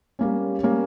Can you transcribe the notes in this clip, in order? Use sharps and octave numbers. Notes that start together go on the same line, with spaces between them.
G3 A#3 C#4
G3 A#3 C#4